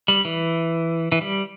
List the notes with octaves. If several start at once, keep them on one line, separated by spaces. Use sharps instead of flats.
G3
E3
E3
G3